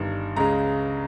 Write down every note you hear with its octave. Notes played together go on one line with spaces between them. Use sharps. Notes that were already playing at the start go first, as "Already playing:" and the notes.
Already playing: G1 G2 D#3
C#2 C#3 G#3 A#5